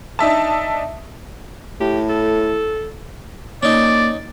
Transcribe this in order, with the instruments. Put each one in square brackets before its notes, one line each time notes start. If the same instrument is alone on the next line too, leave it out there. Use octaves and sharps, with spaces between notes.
[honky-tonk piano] D4 D#4 E5 A5
[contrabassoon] A2 [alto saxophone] G4
[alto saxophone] A4
[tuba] A#3 [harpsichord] C#4 D#4 [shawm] D5